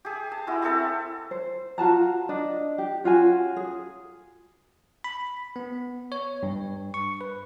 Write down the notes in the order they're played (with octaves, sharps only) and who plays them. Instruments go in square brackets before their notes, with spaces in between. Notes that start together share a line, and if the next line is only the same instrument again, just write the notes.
[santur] G4 G#4
A5
G#3 B3 E4 F#4
C4 E4 A4 B4
[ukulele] C5
F4 F#4 A5 A#5
D4 D#5
G4
C#4 F4 F#4 G#5
G#4
[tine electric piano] B5
B3
C#5
G2
C#6
B4